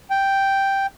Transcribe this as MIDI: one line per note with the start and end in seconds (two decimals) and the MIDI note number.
0.10 0.86 79